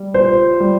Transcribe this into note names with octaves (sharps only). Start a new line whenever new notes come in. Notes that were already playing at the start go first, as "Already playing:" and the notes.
Already playing: G3
F4 C5
G3